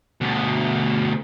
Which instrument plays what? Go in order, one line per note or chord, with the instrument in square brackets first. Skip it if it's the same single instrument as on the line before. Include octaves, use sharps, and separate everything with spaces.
[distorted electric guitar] D2 B2